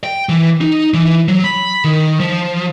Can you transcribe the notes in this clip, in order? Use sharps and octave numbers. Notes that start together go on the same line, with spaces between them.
G5
E3
D#4
E3
F#3
B5
D#3
F3